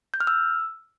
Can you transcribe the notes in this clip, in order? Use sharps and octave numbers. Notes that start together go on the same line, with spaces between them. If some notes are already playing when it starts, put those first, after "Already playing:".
G6
F6
E6